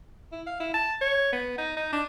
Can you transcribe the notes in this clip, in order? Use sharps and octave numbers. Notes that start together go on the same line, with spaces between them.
E4
F5
E4
A5
C#5
B3
D#4
D#4
D4